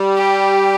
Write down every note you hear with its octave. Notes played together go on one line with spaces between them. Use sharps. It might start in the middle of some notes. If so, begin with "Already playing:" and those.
Already playing: G3
G4